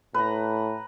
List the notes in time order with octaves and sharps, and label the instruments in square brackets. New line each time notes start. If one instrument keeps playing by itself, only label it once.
[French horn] A2 [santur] B4 A#5